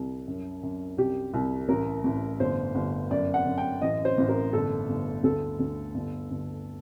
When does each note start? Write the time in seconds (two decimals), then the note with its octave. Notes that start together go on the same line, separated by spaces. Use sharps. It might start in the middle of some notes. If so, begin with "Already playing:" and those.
Already playing: C2
0.28 F#2
0.63 F#2
0.98 C2 G4
1.34 C2
1.68 A1 A#4
2.04 A1
2.40 G1 C5
2.75 G1
3.10 F#2 D5
3.34 F#5
3.46 F#2
3.58 G5
3.82 A1 D#5
4.05 C5
4.18 A1
4.29 A#4
4.53 G1 A4
4.88 G1
5.24 D2 A4
5.59 D2
5.94 G1
6.30 G1